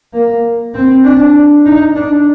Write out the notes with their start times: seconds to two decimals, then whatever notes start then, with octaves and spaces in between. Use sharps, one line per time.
0.13 A#3
0.74 C4
1.04 D4
1.66 D#4
1.95 D4